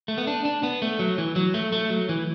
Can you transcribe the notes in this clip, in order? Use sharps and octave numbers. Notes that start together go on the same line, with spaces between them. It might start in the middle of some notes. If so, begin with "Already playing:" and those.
A3
B3
D4
D4
B3
A3
F#3
E3
F#3
A3
A3
F#3
E3